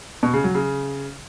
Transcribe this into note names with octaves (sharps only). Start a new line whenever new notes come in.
B2
C#3
F#3
C#3